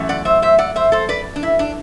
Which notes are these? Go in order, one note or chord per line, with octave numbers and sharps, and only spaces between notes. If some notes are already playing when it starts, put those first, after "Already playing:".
Already playing: F#2 E3 A3
D5 F#5
C5 E5
C5 E5
D5 F#5
C5 E5
A4 C5
B4 D5
D4
E4
D4